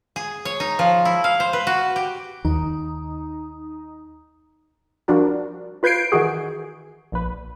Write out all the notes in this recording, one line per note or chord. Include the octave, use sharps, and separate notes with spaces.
G#4
C#5
D#4
F3
E4
F5
C5
B4
F#4
G4
D#2 D#4
F3 G3 D4 F#4 A#4
F4 B4 G6 G#6 C7 D7
D#3 E3 F#4 G#4
A#1 B4